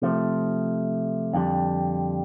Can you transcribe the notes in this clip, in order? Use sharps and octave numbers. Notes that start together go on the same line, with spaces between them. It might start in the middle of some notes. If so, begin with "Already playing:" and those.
C3 F3 A3
F2 D3 G3